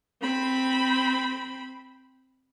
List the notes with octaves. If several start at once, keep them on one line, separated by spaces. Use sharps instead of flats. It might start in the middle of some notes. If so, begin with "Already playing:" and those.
C4 B5